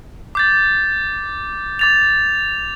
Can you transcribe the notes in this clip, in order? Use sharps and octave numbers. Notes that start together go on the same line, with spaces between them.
D6 G6 A6
D6 A6 F7